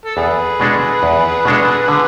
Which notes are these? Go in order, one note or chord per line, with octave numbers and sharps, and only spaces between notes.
A4
E2 G#4 B4
B2 G#3 D4 A4
E2
B2 G#3 D4 A4
D3